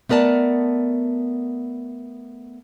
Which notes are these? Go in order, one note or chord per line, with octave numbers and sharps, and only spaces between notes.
A3 B3 A#4 D5 A5